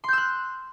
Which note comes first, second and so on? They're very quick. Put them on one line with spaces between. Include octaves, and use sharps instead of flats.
C6 G6 E6 F#6